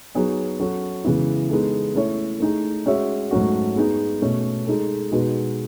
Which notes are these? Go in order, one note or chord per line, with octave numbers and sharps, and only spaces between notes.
F#3 B3 D#4 G#4 C#5
F#3 C#4 F#4 A4
C#3 E3 G#3 B3 E4
G#3 B3 D#4 A4
A3 C#4 E4 A4 C#5
A3 D#4 G#4
G#3 C#4 F#4 C#5 E5
G#2 F#3 A3 C#4 F#4
G#3 B3 D#4 G#4
B2 A3 C#4
G#3 D#4 A4
B2 G#3 D#4 F#4 B4